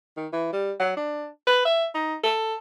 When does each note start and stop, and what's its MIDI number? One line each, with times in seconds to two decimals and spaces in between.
0.17 0.27 51
0.33 0.48 52
0.53 0.72 55
0.79 0.95 54
0.97 1.27 62
1.47 1.61 71
1.65 1.87 76
1.94 2.15 63
2.23 2.56 69